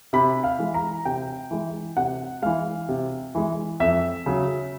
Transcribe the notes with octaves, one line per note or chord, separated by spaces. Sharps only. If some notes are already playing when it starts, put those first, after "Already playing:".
C3 B5
F5
E3 G#3
A#5
C3 G5
E3 G#3
C3 F#5
E3 G#3 F5
C3
E3 G#3
F2 E5
C#3 F#3